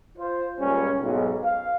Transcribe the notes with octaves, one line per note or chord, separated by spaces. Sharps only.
F4 C5
C#2 A#2 G3 C#4
B1 G#2
F5